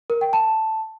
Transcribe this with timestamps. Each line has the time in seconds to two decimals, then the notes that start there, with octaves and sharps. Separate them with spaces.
0.10 A#4
0.21 G5
0.33 A5